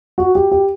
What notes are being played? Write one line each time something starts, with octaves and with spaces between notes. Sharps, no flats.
F#4
G4
G4